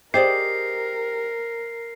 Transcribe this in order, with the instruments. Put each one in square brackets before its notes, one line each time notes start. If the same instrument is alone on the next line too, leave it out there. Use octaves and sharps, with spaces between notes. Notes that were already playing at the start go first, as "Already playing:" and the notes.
[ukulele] G4 G#4 D5 [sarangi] A#4 [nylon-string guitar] C5 D#5 [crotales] C7